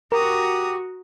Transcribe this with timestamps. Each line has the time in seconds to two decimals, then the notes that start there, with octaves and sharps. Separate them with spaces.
0.12 F#4 G4 A#4 A#5 D#6